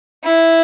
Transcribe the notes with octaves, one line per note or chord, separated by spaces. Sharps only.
E4